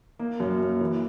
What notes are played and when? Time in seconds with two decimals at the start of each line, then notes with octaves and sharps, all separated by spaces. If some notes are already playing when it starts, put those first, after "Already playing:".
0.19 A#3
0.40 F#2
0.61 A#3
0.81 E3